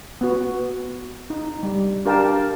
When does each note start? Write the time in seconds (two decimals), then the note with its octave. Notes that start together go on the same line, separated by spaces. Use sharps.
0.21 B3 F#4
1.30 D#4
1.63 G3
2.05 D4 G4 A#4 F5 G5 A5